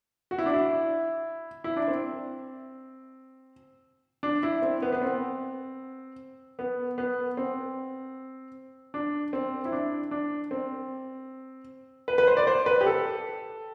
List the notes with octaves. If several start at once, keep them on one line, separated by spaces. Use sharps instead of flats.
F#4
E4
D4
E4
E4
D4
C4
D4
E4
C4
B3
B3
C4
B3
B3
C4
D4
C4
E4
D4
D4
C4
B4
B4
C5
D5
C5
B4
G4
A4